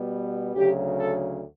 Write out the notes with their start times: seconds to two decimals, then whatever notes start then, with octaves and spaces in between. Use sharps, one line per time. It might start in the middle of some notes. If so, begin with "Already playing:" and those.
Already playing: B2 G3 B3
0.54 D2 C#3 F#3 G4
0.98 A4